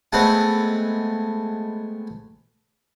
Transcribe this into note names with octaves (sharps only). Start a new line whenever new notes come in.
G#3 A3 B3 C4 F#5